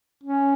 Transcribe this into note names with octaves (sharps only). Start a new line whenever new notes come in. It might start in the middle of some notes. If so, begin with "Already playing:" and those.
C#4